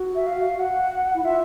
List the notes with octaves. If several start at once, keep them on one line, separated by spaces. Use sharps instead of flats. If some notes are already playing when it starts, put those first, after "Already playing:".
Already playing: F#4
E5
F5
F#5
E4
F4 E5